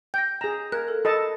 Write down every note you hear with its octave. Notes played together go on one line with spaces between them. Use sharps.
G5 G6 A#6
G#4 A#5 E7
A#4 F#6 G#6
A4
A4 D#5 A5 B5